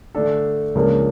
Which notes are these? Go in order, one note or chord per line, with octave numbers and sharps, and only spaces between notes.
D3 A3 D4 A4
C#2 C#3 F3 A#3 D4